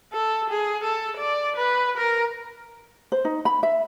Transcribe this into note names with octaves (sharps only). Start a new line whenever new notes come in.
A4
G#4
A4
D5
B4
A#4
C5
D#4
B5
E5